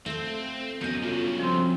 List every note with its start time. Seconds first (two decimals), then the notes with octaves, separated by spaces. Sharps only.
0.06 A3 C4 F4
0.81 F#2 F#3 B3 C#4 D#5 G6
1.02 G2 C#3 F4 A4
1.39 F3 C4